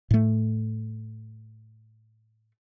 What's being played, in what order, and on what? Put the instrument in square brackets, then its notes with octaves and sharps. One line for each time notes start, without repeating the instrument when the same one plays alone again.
[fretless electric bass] A2 A3